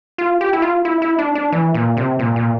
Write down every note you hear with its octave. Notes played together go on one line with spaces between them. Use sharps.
F4
G4
E4
F4
E4
E4
D4
D4
E3
A#2
C3
A#2
A#2